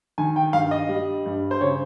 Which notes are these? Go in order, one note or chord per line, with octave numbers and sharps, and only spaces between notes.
D#3 G#5
G5
G2 F5
D#5
G3
G2
C5
C#3 C#5